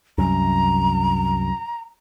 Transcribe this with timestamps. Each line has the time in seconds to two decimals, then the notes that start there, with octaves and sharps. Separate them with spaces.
0.18 C2 F#2 A#5